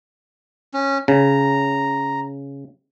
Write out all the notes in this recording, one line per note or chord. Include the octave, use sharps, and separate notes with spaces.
C#4
C#3 A#5